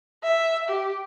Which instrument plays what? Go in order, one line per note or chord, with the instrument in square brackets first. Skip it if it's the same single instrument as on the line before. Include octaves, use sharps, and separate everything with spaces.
[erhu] E5
G4